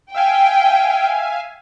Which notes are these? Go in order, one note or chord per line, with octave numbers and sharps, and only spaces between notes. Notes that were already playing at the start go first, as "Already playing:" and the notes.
E5 F5 G5 G#5